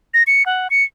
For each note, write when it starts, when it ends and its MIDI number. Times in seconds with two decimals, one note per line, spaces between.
0.14 0.23 94
0.27 0.46 97
0.46 0.68 78
0.70 0.84 97